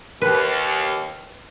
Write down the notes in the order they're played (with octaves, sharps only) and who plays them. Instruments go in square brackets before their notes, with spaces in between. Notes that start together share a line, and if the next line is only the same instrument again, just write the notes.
[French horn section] D#2 [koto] B4